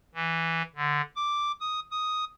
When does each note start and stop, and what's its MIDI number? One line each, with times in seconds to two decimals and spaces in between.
0.15 0.62 52
0.76 1.01 50
1.16 1.52 86
1.61 1.80 87
1.91 2.25 87